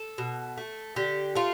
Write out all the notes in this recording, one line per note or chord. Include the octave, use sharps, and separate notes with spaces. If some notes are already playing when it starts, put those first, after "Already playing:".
Already playing: A4
B2
A3
D3 G4
A3 F4